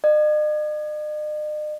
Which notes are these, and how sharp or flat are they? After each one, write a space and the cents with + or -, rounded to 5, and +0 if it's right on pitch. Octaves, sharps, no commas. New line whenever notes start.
D#5 -45